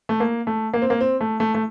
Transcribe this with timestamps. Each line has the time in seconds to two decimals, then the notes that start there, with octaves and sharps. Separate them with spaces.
0.09 A3
0.20 A#3
0.47 A3
0.74 A#3
0.82 C4
0.90 A#3
1.01 C4
1.21 A3
1.40 A3
1.55 A3